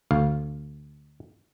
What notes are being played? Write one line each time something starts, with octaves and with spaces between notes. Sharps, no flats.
D2 F5